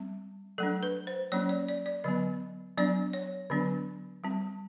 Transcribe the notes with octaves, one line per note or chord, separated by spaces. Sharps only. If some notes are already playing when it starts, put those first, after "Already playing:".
Already playing: G3 C4
F#3 A3 D4 A4
B4
C5
F#3 A#3 C#4 C#5
D5
D5
D5
D3 F#3 B3 D#5
F#3 B3 D4 D5
C#5
D3 F#3 B3 D4
G3 C4